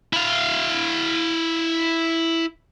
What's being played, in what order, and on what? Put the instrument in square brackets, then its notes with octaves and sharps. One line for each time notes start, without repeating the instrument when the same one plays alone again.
[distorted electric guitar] E4 F5